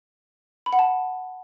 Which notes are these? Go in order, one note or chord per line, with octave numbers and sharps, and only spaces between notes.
B5
F#5
A5